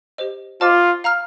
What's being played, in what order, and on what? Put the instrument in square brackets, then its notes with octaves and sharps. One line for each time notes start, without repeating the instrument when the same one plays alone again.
[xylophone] G4 C5 D#5
[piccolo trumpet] F4 [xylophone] C5 D#5 A5 D6 F6
[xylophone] F5 A#5 F6